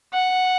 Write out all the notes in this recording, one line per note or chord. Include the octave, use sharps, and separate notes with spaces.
F#5